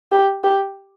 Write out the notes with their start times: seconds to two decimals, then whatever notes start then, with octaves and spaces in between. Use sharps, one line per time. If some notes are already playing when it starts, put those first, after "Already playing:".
0.12 G4
0.44 G4